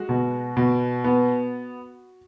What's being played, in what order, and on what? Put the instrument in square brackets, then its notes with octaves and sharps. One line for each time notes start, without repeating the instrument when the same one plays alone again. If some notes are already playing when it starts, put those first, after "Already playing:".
Already playing: [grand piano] G#3 F#4
B2
B2
B3